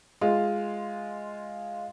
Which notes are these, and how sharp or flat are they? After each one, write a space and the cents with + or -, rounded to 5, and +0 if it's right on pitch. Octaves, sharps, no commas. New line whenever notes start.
G#3 +0 F4 +0